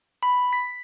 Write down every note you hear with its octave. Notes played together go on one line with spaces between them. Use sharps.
B5
B6